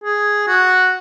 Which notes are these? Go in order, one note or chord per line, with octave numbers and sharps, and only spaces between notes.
G#4
F#4